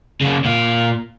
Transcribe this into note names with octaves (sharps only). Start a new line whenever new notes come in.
C#3 A#3
A#2 F5